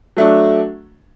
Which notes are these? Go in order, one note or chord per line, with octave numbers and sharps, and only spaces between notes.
F#3 A3 D4